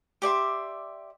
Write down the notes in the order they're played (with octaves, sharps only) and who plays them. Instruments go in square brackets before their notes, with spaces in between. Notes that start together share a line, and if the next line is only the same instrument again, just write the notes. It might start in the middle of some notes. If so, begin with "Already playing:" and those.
[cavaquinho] G4 D5 E5 C6